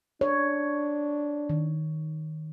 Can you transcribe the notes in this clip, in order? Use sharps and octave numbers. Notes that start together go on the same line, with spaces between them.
D4 C#5
D#3